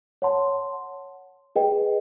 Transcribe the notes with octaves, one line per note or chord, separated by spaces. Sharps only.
C#5 F#5 A5 C6
G#4 B4 D#5 G5